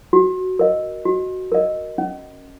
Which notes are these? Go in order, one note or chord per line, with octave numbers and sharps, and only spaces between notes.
F#4
A#4 D#5
F#4
A#4 D#5
C#4